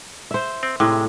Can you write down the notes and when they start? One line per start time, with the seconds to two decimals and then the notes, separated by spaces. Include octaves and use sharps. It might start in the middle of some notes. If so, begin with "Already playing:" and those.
0.31 C5 E5
0.63 C4
0.80 A2 C3 G#3